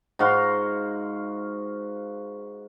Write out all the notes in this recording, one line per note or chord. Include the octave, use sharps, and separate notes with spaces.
G#2 F#4 F5 C6